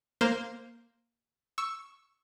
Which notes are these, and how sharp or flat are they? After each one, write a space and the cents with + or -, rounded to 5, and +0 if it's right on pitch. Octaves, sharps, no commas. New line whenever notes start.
A#3 +0 C5 +0
C#6 +0 E6 +0